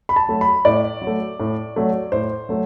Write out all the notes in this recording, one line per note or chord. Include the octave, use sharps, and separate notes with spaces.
B5
A5
F#3 A3
B5
A2 D5
F#3
A3
A2
F#3 A3
A2 C5
F#3 A3